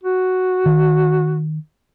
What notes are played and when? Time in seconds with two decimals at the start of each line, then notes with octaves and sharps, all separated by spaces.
0.04 F#4
0.66 D#3